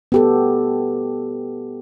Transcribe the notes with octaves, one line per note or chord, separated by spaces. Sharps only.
B3 G4 A4